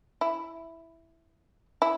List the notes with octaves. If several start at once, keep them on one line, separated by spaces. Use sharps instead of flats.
E4
E4